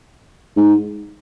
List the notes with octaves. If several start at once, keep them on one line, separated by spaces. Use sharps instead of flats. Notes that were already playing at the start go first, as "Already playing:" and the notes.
G#2